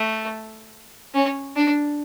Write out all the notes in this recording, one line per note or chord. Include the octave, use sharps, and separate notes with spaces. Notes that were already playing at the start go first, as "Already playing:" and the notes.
Already playing: A3
C#4
D4